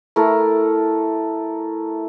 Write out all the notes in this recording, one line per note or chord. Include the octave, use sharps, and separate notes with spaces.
A3 E4 A4 A#4